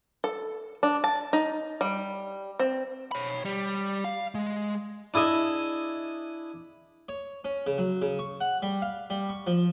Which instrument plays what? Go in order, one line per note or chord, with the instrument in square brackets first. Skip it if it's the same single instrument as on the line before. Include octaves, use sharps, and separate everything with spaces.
[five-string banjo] A4
D4
A5
D#4
G3
C4
[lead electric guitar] C#5 B5
G3
F5
G#3
[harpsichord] D4 E4 G#4 D#5 E5
C#5
C#4
C#3
F#3
C#3
C#6
F#5
G3
F5
G3
C#6
F3